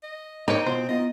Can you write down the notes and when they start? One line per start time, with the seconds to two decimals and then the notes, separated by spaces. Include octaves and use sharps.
0.03 D#5
0.48 A#3 C4 D#4 G4 C#5 A#5
0.66 B2 F4 C5 C6
0.89 B3 F4 D#5